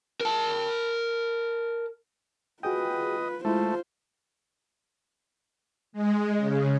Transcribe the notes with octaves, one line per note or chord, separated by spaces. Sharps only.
A#4 A5
F4 F#4 G#4 B4 D#5 G5
G#3 A3 E4 F4 C5
G#3
C#3